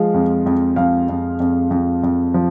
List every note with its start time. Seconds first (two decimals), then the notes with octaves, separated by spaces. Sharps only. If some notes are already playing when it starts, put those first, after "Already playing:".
Already playing: F3 G#3 F5
0.14 F2
0.46 F2
0.76 F2 F5
1.09 F2
1.40 F2
1.71 F2
2.03 F2
2.34 F3